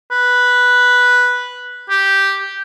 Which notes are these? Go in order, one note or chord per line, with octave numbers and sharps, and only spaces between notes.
B4
G4